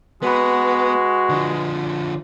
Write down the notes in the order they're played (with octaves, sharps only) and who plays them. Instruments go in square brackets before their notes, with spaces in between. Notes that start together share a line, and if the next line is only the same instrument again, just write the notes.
[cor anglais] G#3 [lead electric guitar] B3 [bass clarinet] F#4 [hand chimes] B4 B5
[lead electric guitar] D3 F3